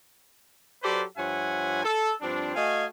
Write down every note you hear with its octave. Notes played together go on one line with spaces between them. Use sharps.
F#3 G4 A4 B4 C5 D5
G2 F3 C#5 E5 F#5 G#5
A4
G2 F3 C4 D4
A3 F#4 D#5 F5 G#5